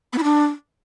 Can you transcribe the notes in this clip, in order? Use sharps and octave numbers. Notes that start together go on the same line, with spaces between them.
B3
E4
D4